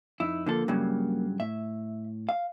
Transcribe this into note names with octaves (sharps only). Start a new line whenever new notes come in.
F2 D#4 E4
D3 F3 A#3 A4
G2 C#3 F#3
A2 E5
F5